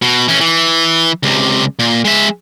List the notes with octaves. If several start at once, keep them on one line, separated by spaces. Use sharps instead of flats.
B2
E3 C#4
E3
C#2 C3
A#2
G#3 E5